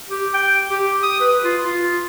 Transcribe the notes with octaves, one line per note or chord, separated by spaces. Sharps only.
G4
G5
G4
D#6
B4
F4
F4